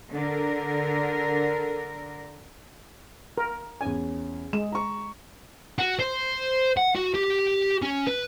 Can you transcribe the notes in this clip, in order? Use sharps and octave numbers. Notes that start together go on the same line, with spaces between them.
D3 A#4
A#4
E2 C#4 G#5
G#3 E7
A#5 C#6
F#4
C5
F#5
F#4
G4
C#4
B4